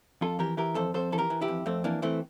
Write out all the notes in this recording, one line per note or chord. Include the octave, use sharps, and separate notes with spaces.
F2 F4 A4
E3 G4 A#4
E3 G4 A#4
F2 A4 C5
F2 A4 C5
E3 A4
G4 A#4
E3
E4 G4
F2
F2 A3 C4
E3 A#3 D4
E3 A3 C4